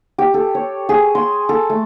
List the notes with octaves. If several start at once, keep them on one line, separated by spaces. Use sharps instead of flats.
G4
A4
C#5
G#4
C6
A4
A3